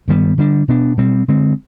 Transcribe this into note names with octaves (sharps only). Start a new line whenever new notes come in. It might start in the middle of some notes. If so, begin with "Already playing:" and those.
G2 D#3 G3 B3
D3 G3 D4
B2 B3 D4
B2 G3 C4
D3 G#3 C4